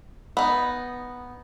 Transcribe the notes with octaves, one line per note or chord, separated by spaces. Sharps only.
B3 D#4